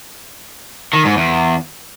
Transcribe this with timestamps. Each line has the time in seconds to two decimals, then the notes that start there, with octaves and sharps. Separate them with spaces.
0.93 D#3
1.05 G#2
1.17 E2